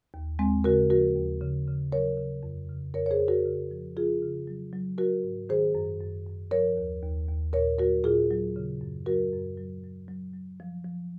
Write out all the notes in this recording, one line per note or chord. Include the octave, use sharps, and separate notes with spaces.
D#2
D#2 G#3 C4
C#3 F#4 A#4
F3 F#4 A#4
D#2
C#3
C#3
F#3 A#4 C#5
C#3
F2
C#3
F2 A#4 C#5
C#5
G#4 C5
F2
F#4 A#4
C#3
F3
F3 F4 G#4
C#3
F#3
F#3
F#3 F#4 A#4
G#2
D#3 G#4 C5
F#2
F#2
F#2
F3 A#4 C#5
D#2
D#2
D#2
A#2 A#4 C#5
F#3 F#4 A#4
A#2 F4 G#4
F#3
C#3
F#2
F#3 F#4 A#4
F#2
F#3
F#3
F#3
F#3
F3
F3